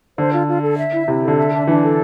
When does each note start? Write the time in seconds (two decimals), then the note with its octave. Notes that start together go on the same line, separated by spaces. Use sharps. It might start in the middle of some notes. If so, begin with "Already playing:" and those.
0.18 D3 C5
0.33 F4
0.48 F4
0.62 A4
0.78 E5
0.92 E4
1.07 C3 E4
1.23 D3 A4
1.37 E5
1.52 D4
1.67 E3 D4
1.83 A4